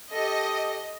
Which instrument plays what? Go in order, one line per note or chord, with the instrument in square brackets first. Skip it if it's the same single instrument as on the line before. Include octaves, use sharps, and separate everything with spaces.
[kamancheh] G4 A4 [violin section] D#5